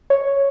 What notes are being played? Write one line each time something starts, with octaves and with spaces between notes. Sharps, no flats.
C#5